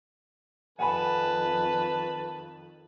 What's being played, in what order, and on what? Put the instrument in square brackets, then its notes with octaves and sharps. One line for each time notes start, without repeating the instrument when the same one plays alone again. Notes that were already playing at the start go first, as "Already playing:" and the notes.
[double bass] F2 D#3 [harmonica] B4 A5 [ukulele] F#5 G#5 B5